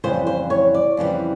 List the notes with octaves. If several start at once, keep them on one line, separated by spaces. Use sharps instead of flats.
F2 C#3 E3 G3 C5
C5
C#5
D5
F2 C#3 E3 G3